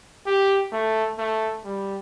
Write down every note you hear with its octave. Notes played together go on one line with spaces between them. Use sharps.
G4
A3
A3
G3